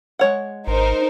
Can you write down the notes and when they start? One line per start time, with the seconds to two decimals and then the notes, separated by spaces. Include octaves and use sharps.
0.19 G#3 C#5 F#5
0.67 G#1 D#4 A#4 C5